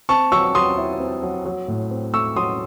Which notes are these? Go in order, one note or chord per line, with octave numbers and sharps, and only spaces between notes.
C4 A5 C#6
F#3 C#6 E6
F#3 C6 D#6
E4
C4
F#3
F#3
A2
C4
A3 C#6 E6
F#3 C6 D#6